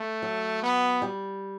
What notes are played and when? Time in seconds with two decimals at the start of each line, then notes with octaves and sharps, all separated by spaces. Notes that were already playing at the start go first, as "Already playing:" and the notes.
Already playing: A3
0.22 F#3
0.62 B3
1.02 G3